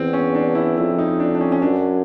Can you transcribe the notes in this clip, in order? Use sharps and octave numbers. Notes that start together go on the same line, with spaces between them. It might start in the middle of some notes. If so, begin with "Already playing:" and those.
Already playing: E2 C4
C#4
D4
E4
F2 E4
D#4
D4
D4
C#4
C#4
F#2 D4